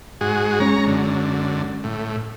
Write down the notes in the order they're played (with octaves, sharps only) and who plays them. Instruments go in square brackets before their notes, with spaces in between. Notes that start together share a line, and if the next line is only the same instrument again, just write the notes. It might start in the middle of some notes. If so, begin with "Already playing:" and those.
[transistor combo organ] G#2 F#4 G#4
[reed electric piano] G#3 C#4 [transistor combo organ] C#5 A#5
[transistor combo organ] F#2 D3
A2